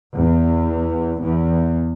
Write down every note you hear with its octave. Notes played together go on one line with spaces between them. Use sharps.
E2
E2